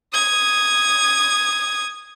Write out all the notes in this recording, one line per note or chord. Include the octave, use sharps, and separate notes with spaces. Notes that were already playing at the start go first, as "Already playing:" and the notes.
D#6 G#6